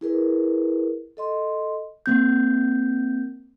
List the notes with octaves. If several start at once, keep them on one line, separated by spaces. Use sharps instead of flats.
E4 G#4 A#4 B4
A4 D#5 C6
A#3 C4 G6